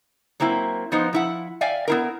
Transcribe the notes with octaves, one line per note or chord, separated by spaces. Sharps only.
F#3 A#3 C4 E4
F3 B3 D#4 C5
F3 E4 F#5
D5 E5 F5 G5 G#5
B3 E4 A#4